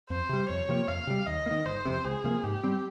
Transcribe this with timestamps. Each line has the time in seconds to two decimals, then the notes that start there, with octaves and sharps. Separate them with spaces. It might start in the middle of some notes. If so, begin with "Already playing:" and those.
0.09 F2 C5
0.29 C3 G3
0.49 F2 C#5
0.69 C3 F3 A#3
0.88 F2 F5
1.07 C3 G3
1.26 D#2 D#5
1.46 A#3
1.51 D#3
1.66 G1 C5
1.85 F2 C3
2.04 C#2 G#4
2.24 C3 F3 A#3
2.44 G#2 G4
2.64 G3 C4